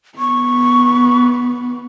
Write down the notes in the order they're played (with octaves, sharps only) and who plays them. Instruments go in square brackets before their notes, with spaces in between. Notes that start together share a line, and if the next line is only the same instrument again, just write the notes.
[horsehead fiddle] B3 [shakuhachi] C#6